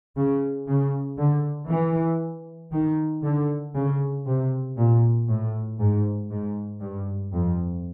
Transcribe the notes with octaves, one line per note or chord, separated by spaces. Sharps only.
C#3
C#3
D3
E3
D#3
D3
C#3
C3
A#2
A2
G#2
G#2
G2
F2